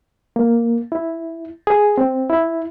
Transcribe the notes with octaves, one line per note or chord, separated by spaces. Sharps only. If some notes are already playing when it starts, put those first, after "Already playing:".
A#3
E4
G#4
C4
E4